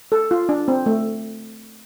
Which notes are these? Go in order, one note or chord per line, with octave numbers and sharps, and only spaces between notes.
A4
F4
D4
C4
A3